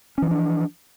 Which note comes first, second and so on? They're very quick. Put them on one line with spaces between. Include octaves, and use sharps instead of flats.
C#4 E3 F3 D4